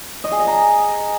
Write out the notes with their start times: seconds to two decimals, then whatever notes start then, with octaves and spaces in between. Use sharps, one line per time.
0.24 D#5
0.32 G#4
0.39 D#5
0.47 A#5